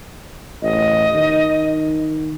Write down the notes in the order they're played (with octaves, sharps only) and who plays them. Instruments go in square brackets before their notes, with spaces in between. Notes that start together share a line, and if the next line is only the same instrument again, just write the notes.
[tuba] A1 [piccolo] D#5
[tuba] D#3